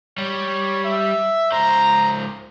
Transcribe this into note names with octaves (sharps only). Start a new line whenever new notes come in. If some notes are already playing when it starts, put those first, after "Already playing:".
G3 C#5
E5
C#2 C5 A#5